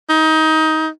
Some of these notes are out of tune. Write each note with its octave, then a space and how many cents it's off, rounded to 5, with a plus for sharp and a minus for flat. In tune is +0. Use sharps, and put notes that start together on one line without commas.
D#4 +20